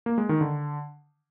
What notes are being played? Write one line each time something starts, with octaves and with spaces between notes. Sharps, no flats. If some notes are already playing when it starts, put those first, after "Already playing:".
A#3
G#3
D#3
D3